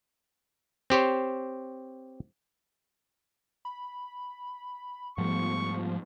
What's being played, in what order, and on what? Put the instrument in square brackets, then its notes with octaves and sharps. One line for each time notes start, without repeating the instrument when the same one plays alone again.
[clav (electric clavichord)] C4 G4 C5 C#5
[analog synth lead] B5
[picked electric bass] G#2 G3 A3 [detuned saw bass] F3 [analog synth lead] B3 [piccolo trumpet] C#6